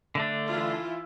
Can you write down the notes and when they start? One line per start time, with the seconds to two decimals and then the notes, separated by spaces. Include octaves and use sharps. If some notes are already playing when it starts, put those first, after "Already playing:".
0.15 D3 A3 D4
0.47 E3 E4 F4